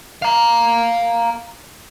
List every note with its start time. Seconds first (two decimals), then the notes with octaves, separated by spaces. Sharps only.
0.22 F5 A#5